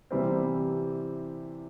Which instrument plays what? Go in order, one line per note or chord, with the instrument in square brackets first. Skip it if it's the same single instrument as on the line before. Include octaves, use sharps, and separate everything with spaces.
[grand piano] C3 E3 G3 C4